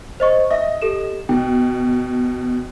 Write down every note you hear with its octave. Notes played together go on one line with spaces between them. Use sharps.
C5 D#5 C#6
D#5 E5
G4 A4 E7
B2 G5